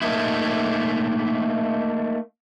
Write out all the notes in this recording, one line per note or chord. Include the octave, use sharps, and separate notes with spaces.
A3 A#3 D#4 E4